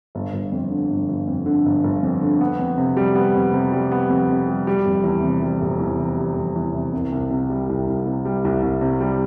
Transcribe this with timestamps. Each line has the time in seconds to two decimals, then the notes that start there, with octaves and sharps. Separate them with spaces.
0.15 G1
0.33 G1
0.52 F2
0.70 D3
0.90 G1
1.09 G1
1.27 F2
1.46 D3
1.66 G1
1.84 G1
2.03 F2
2.21 D3
2.41 B3
2.59 F2
2.78 C3
2.97 G3
3.15 B3
3.35 F2
3.53 C3
3.72 G3
3.92 B3
4.10 F2
4.29 C3
4.48 G3
4.67 G3
4.85 F1
5.04 E2
5.23 C3
5.43 G3
5.62 F1
5.79 E2
5.99 C3
6.17 G3
6.36 F1
6.56 E2
6.74 C3
6.93 C2
7.12 C2
7.30 C3
7.49 G3
7.69 C2
7.87 C2
8.06 C3
8.25 G3
8.45 C2
8.63 C2
8.81 C3
9.01 G3